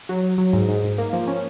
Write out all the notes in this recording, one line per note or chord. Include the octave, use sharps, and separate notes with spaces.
F#3
F#3
F#3
G#2
G#2
G#2
A#3
F3
C#4